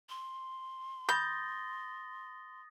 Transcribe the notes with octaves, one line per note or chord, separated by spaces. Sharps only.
C6
B5 D#6 G6 A6 A#6